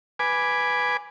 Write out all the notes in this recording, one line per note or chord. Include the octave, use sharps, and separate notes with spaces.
B4 G#5 D6